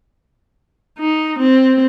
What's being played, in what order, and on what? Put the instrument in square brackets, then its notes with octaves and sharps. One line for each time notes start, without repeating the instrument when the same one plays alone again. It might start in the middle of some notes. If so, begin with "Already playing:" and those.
[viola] D#4
C4